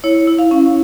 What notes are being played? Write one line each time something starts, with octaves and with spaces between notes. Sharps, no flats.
E4 C#5
E4
F5
C#4